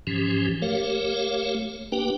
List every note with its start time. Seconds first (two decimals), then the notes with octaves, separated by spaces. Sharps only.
0.07 G#2 E3 F3 C#4 G4
0.62 A3 G4 A#4 C#5 F5
1.92 A#3 D4 G4 B4 G5